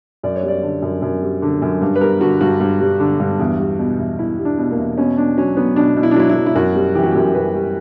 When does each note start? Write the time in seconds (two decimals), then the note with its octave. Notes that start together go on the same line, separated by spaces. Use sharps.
0.23 F#2 D5
0.36 C#5
0.43 G3
0.48 D5
0.63 D3
0.82 F#2
1.02 F#2
1.22 G3
1.42 D3
1.62 F#2
1.81 G2
1.96 B4
2.01 G3 A#4
2.21 D3 F#4
2.41 G2 F#4
2.60 G2
2.81 G3
3.00 D3
3.20 G2
3.39 E2
3.60 G3
3.79 B2
3.99 E2
4.19 E2 E4
4.39 G3
4.45 D4
4.58 B2
4.71 A#3
4.78 E2
4.97 B2 C#4
5.17 B2 D4
5.37 F#3 C#4
5.57 F#3 B3
5.76 B2 D4
5.96 B2
6.03 E4
6.11 D4
6.16 F#3 E4
6.29 E4
6.36 F#3
6.46 E4
6.55 F#2 F#4
6.75 G3
6.95 E3 G4
7.03 F#4
7.11 F#2 G4
7.35 F#2 B4
7.55 G3